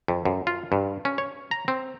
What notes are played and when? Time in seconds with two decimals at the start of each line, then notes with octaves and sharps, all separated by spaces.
0.08 F2
0.25 F#2
0.47 F4
0.72 G2
1.05 C#4
1.18 C#5
1.51 A#5
1.68 C4